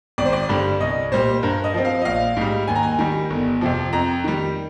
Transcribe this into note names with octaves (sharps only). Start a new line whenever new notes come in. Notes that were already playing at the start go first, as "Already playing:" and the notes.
G#1 D5
C5
D5
G2 D3 G3
C2 D#5
A#2 G3 C5
G2 A#4
D#5
F3 C4
F5
D#5
A#1 F5
G#2 G3
D#2 G#5
A#5
G#5
D#3 G3
G1
F2 C3 F3
F2 A#5
D#3 G3